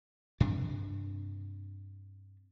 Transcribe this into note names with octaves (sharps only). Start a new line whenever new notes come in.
G2 C3 D4